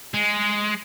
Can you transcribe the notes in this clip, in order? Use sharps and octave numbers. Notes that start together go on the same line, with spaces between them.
G#3